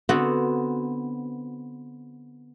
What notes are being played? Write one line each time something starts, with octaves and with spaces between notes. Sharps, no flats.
D3 B3 C4 F#4